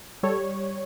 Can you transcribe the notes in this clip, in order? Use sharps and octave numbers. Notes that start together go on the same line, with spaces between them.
G3 A4 C#5